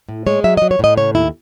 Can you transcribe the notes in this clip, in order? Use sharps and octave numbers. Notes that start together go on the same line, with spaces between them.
A2
G#3 C#5
F#3 E5
D#5
F#3
C#5
A2 D#5
C#3 C#5
D#2 E4